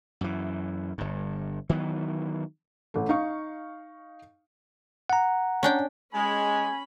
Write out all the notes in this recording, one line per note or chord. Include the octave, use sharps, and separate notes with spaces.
F#2 E3
G1 G2
D#3 E3 F#3 B3
A1 A3
D#4 F5 C#6
F#5 A#5
C#4 D4 G5
G#3 C#4 G#5 B5